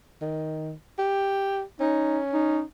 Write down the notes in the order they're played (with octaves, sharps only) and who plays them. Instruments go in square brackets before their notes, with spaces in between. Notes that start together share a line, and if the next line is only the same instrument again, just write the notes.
[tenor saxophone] D#3
G4
[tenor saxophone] C#4 [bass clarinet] D#4
[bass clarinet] D#4